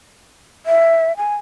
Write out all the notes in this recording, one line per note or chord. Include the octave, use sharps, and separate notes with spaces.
E5
G#5